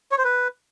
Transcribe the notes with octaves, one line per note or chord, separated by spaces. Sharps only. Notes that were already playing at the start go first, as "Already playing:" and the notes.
C#5
C5
B4